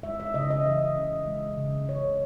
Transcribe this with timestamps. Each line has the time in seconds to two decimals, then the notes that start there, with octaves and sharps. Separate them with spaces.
0.03 G#3 E5
0.20 E5
0.34 C#3 D#5
0.51 D#5
0.65 E3 E5
0.97 C#3
1.27 G#3
1.57 C#3
1.89 C#3 C#5